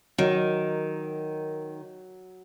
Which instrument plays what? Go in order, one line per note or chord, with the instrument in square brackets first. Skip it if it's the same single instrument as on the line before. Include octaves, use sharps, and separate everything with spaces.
[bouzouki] D#3 [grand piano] F#3